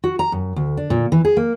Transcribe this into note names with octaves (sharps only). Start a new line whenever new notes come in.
F#4
A#5
F#2
D2
D4
A#2
E3
G#4
A#3